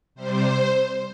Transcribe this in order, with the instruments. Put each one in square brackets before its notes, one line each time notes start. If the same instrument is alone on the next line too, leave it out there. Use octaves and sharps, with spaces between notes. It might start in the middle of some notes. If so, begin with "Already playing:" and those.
[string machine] C3 G3 C5